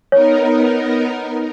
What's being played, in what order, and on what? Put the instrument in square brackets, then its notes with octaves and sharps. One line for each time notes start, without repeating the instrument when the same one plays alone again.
[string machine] B3 D#4 A#4 [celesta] C#5